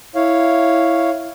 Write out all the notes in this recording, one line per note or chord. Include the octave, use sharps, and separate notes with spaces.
E4 C#5 F5